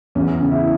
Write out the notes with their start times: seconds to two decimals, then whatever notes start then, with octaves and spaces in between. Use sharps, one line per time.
0.15 E2 C#4
0.40 C#3
0.51 E4